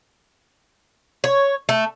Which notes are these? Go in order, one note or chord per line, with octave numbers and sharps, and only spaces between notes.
C#5
A3